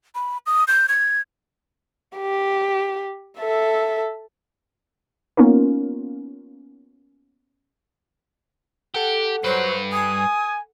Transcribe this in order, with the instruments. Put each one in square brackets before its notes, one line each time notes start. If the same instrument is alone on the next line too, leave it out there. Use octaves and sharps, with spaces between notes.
[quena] B5
D#6
G6
G#6
[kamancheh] G4
A4 E5
[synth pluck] A#3 B3 C#4 D#4 F4 A#4
[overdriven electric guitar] G4 [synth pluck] A4 F#5
[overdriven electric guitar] G2 B4 [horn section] F#3 [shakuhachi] C5
[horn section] G#5 [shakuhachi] D#6